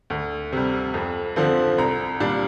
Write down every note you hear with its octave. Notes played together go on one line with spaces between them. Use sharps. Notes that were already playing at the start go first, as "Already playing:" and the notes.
D2
C3 G3
F2
D3 F3 C4
C2 A#5
A#2 G3 D4